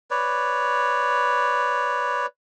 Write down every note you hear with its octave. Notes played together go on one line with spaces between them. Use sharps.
B4 C#5 D5